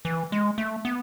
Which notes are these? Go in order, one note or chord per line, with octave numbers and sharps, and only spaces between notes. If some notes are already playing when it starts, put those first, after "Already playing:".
E3
G#3
A3
B3